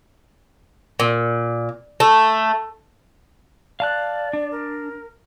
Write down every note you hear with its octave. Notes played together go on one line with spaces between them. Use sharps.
A#2
A3
D5 F5 A5 F#6
D4
A#4